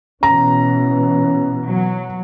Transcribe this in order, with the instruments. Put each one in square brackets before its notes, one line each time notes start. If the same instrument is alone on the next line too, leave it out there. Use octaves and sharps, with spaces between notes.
[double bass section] B2 E3 [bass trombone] C#4 [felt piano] A#5
[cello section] F#3